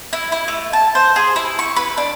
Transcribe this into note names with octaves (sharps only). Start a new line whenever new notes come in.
E4
E4
A3
A5
C5
G#4
E4
C#6
B4
D4